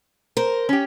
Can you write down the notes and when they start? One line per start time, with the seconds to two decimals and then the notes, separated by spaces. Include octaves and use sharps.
0.37 A#4 C5
0.69 C#4 G4